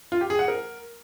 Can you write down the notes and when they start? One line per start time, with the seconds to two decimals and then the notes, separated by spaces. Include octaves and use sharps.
0.12 F4
0.21 G4
0.30 G#4
0.39 F#5
0.48 A#4